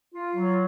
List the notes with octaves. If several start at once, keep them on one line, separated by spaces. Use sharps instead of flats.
F4
F#3